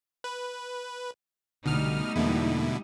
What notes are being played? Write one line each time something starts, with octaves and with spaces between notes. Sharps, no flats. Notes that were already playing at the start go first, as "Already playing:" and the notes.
B4
C2 B2 D3 G3 A3 D#4 F6
E2 B2 D3 A#3 E4